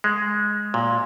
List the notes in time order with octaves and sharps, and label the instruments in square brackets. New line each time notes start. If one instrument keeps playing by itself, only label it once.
[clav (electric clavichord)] G#3
A#2